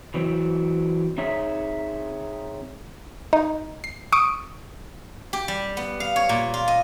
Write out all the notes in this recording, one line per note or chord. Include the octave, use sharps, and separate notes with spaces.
E3 F#3 C4
C4 D#4 G#4 C#5 E5
D#4
C7
C#6 D#6 D7
G4
G3
B3
F5
C#5
A#2
F4
D#5